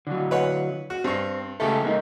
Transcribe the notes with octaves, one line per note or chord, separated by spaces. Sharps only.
D3 F#3
B4 C#5 F#5
F#4
G2 C4 C#6
C#2 C#3 A3 G4 A4
G#3 A#3 D#4